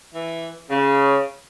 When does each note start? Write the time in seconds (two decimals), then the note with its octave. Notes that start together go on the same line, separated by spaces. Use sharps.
0.15 E3
0.71 C#3